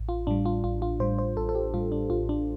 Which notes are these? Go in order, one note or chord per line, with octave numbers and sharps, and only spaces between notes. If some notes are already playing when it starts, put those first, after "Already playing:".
Already playing: A1
F4
A2 G3 D4
F4
A1 F4
F4
A2 G3 C5
C5
A1 A4
A4
G4
A2 G3 F4
D4
A1 F4
D4